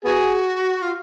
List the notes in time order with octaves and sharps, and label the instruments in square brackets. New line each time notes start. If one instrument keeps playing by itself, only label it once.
[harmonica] B3 G#4 [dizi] F#4
[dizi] F4